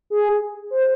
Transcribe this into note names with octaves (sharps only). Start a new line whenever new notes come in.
G#4
C5